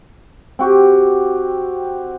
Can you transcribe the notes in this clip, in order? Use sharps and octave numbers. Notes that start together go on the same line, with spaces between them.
C4 F#4 G4